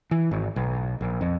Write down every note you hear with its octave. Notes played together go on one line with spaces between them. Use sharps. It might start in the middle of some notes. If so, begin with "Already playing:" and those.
E3
G#1
B1
A#1
F2